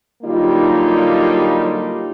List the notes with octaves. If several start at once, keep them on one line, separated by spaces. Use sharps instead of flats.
D3 F#3 G3 A#3 D#4 F4